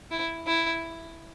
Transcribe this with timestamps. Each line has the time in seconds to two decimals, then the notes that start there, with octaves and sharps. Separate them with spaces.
0.11 E4
0.47 E4